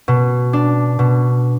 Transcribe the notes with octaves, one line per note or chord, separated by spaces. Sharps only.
B2
D4
B2